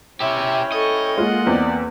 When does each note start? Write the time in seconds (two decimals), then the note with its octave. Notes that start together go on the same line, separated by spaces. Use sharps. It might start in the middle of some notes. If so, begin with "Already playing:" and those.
0.20 C#4 E4 G4 E5 G5
0.72 A4 D#5 C#6
1.18 G#3 A#3 F4 F#5
1.47 E2 C4 D5